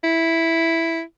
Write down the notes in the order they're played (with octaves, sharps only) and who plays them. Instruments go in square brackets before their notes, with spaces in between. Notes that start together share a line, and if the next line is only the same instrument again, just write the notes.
[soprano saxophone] E4